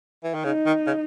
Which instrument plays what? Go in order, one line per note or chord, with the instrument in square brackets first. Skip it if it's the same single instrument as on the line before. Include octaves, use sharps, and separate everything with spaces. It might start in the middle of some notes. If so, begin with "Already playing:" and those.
[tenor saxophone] E3
D#3
[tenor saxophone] C#3 [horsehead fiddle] D#4
[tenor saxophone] D#3
C#3